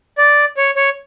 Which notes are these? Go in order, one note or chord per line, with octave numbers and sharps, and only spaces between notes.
D5
C#5
C#5